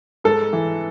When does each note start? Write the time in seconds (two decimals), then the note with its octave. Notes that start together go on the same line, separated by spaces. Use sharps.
0.24 G#2 A4
0.53 E3